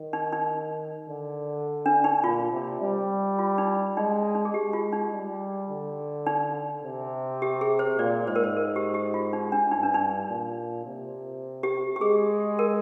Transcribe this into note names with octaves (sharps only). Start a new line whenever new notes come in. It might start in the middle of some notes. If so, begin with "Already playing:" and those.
Already playing: D#3
D#4
D#4
D3
D4
D#4
A#2 F4
C3
G3
F4
D#4
G#3 D#4
D#4
D#4
G#4
G#3 G4
F4
D#4
G3
D3
D#4
C3
G4
G#4
C5
A#2 D5
G#2 C5
A#4
C5
A#4
G4
G4
F4
D#4
D4
G2 D#4
D4
D#4
A#2
C3
G4
G4
G#3 G#4
A#4